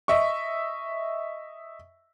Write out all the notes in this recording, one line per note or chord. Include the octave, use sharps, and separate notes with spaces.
D#5 E5 C#6